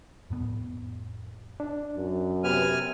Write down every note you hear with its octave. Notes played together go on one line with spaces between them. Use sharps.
F2 A2 B3
D4
F#2
C3 B3 G4 B4 G#5 F6